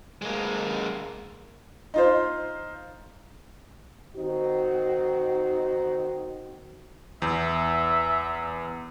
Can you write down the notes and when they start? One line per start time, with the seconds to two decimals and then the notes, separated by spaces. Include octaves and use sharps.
0.22 G#3 A#3
1.94 D#4 F4 C5
4.16 D#3 C4 D#4 F#4
7.22 E2 E5